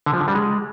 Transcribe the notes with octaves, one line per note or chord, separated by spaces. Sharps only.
D3
F3
D3
G3
G#3